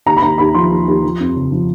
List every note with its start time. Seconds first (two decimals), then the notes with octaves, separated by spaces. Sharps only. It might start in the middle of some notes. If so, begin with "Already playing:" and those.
0.06 D#2 A#5
0.17 B5
0.22 D#2 A#5
0.38 D#2 B5
0.54 F3 C6
0.71 D#2
0.88 D#2
1.04 F3
1.20 F2
1.36 C#3
1.52 F3